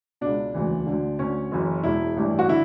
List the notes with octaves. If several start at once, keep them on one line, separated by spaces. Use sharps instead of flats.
C#2 B2 D4
E1 D2 C#3 E3
D2 D3
D2 D3 C#4
F#1 F#2 E3
E1 E2 B2 E4
A1 G2 E3
F#4
D3 E4